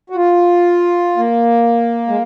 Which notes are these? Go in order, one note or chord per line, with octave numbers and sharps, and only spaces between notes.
F#4
F4
A#3
G#3